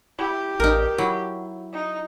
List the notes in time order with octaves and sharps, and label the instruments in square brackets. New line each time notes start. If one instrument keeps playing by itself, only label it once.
[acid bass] E4 [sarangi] G4
[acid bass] A1 [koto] D#4 A#4
[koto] F#3 [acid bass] E4
[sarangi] D#4